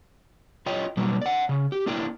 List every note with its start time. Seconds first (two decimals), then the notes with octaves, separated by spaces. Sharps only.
0.66 F4 C#5 D#5 G5
0.97 B2 F#3 G3 A#3
1.22 D5 F#5
1.49 C#3
1.72 G4
1.86 A#3 D4 E4 A#4 G5